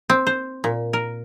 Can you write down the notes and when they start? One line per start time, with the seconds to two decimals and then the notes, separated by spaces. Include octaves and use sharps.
0.10 C4
0.27 C5
0.64 A#2
0.93 A#4